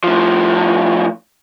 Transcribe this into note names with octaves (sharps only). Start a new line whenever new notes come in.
A2 F3